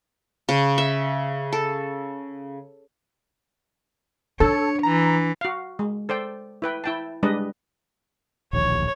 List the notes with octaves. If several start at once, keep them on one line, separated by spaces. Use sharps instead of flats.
C#3
E5
A4
D4 A4 C#5
E3 A#5
F#4 F5
G#3
A4 C5 D5 G5
E4 B4 G5
E4 G5 A5
G3 G#3 D4 B4 D#5
D1 A#1 D#2 C#5